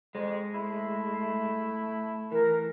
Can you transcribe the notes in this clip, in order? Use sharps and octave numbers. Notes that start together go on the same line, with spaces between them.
F2 G#3
A3 E4
E3 A#4